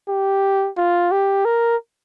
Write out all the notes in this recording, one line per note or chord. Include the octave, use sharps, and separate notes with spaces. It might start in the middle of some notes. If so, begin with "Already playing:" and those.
G4
F4
G4
A#4